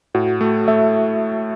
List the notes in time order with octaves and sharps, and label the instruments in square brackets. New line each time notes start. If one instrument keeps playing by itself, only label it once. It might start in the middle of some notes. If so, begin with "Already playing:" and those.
[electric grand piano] A2 [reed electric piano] F#4
[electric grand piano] A3
[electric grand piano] A3 [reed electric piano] E5